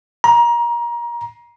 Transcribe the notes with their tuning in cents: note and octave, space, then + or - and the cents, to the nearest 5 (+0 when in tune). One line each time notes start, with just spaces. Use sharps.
A#5 +25